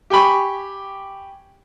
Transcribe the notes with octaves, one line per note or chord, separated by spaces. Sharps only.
G4 G5 G#5 B5 C#6